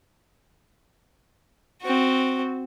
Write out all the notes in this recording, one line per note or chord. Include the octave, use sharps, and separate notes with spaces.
C4 F#4